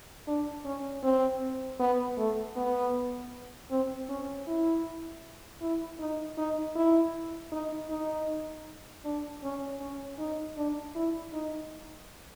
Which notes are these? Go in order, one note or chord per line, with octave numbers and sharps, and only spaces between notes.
D4
C#4
C4
B3
A3
B3
C4
C#4
E4
E4
D#4
D#4
E4
D#4
D#4
D4
C#4
C#4
D#4
D4
E4
D#4